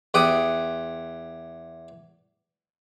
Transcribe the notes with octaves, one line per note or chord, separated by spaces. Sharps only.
E2 G4 F#5 D#6